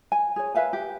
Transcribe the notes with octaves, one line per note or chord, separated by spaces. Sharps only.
G#5
G#4 C#5
B4 E5 F5 G#5
G4